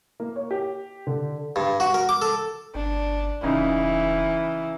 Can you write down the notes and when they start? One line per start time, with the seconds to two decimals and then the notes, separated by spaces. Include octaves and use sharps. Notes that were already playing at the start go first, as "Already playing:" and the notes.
0.20 A#3
0.36 C#5
0.51 G4
1.07 D3
1.56 G2
1.80 F#4
1.94 A#4
2.09 D6
2.22 A4
2.75 G1 D4
3.43 E1 C#3 E3 D#4